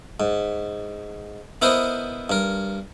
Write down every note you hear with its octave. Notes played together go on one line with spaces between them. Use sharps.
G#2
B3 E4 A#4 C5 D#5
G2 A#4